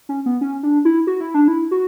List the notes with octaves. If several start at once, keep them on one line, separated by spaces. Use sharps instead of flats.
C#4
B3
C#4
D4
E4
F#4
E4
D4
E4
F#4